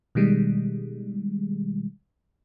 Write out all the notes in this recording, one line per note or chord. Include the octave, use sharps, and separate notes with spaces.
B2 D#3 G3 G#3